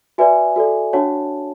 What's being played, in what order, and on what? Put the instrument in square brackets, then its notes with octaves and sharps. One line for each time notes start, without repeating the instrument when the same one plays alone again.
[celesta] F#4 B4 D5 E5 G#5
F#4 A4 D5
D4 F#4 C#5 F#5 A5